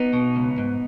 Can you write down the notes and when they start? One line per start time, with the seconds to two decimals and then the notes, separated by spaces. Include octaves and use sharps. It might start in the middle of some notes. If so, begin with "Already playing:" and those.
Already playing: B3 D#4
0.13 B2
0.36 C#2
0.58 G#2